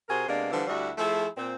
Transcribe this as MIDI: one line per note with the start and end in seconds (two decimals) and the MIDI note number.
0.09 0.25 48
0.09 0.25 66
0.09 0.25 68
0.09 0.25 70
0.09 0.25 72
0.28 0.50 48
0.28 0.50 56
0.28 0.50 58
0.28 0.50 59
0.28 0.50 62
0.52 0.64 50
0.52 0.64 52
0.52 0.64 53
0.52 0.64 55
0.52 0.64 71
0.68 0.90 38
0.68 0.90 55
0.68 0.90 64
0.68 0.90 66
0.98 1.27 53
0.98 1.27 57
0.98 1.27 64
0.98 1.27 68
1.37 1.55 46
1.37 1.55 60